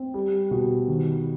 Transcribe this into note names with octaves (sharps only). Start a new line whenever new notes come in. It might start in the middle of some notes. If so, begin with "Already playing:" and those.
Already playing: C4
G3
B2
D#3